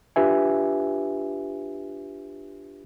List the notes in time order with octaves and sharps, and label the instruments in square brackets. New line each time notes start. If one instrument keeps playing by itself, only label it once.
[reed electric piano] D4 F4 G4 B4 E5 G#5